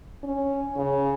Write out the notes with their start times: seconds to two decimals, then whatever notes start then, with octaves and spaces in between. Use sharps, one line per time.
0.24 C#4
0.77 C#3